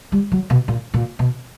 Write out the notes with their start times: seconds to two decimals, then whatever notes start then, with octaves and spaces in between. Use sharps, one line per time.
0.12 G3
0.32 F#3
0.50 B2
0.68 A#2
0.94 A#2
1.19 B2